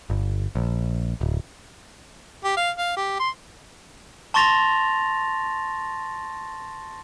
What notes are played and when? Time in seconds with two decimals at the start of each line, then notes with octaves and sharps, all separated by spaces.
0.10 G1
0.55 A#1
1.21 D1
2.44 G4
2.57 F5
2.78 F5
2.97 G4
3.20 C6
4.34 A5 C6 C#6 A6 A#6 F7